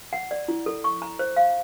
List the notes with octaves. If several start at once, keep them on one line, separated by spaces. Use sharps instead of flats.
F#5
D5
E4
A4
C#6
A#5
C5
F5